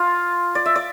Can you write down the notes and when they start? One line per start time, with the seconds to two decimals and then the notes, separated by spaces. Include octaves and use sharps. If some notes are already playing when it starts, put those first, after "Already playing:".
Already playing: F4
0.55 D5
0.66 E5
0.75 D5